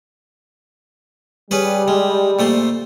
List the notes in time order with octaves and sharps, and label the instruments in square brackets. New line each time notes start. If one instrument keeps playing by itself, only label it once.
[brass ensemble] G3 [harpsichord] C#4 G#4 B4
[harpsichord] G#3
A#2 A3 C5